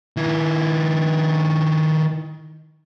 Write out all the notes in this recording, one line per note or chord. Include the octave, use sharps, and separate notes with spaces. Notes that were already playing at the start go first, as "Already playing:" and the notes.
D#3 E4